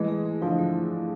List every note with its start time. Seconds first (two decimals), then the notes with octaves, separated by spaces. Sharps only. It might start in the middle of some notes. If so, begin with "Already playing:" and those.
Already playing: E3 G#3 A3
0.08 G#4
0.25 A3
0.42 D3 F3 E4
0.58 A3